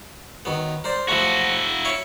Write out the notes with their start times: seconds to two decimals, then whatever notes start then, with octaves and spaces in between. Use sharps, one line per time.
0.45 D#3 F#3 B3
0.84 A#4 C5 D5
1.08 F3 F#3 A3 E4 F#4
1.85 C#5 E5 B5